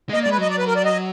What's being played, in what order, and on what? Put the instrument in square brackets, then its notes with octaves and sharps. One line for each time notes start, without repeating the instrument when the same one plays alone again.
[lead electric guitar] G#3
[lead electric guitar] A#3 [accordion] D#5
[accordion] D5
[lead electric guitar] G#3
[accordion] B4
[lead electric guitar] F#3 [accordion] D#5
[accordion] D5
B4
A#4
D5
D#5